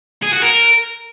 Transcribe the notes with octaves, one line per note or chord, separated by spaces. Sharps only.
G#4
F#4
A#4